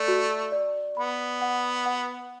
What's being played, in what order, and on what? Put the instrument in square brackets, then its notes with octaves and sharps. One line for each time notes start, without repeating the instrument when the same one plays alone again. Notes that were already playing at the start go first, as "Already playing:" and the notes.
Already playing: [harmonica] A3 [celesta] D5
[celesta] F#4
D5
[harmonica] B3 [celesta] B5
[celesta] F#5
F#5